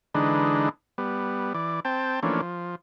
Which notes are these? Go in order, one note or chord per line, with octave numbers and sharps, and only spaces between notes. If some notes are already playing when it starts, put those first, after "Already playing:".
D3 E3 G#3 D4 D#4 B4
G3 B3
E3 D5
C4 G5 A5
E3 F3 A3 A#3 C#4 D4
F3